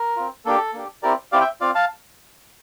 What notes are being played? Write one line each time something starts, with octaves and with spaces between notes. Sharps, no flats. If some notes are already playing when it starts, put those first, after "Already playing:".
Already playing: A#4
C4 F4
A#3 D4 G4 A4
A#3 D4 G4
C4 E4 G4 A#4 D5
C4 E4 G4 D5 F5
E5 G5
C4 F4 D5 F5
F5 A5